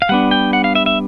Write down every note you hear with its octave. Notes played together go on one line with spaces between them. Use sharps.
F5
G3 B3 D4 F#5
G5
F#5
F5
E5
E5